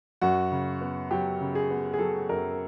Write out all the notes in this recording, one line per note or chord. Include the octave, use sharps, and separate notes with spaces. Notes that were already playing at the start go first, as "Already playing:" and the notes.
F#2 F#4
C#3
B3
F#3 G4
C#3
G#4
B3
G#4
F#3 A4
F#2 A#4